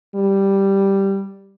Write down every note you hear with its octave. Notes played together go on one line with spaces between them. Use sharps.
G3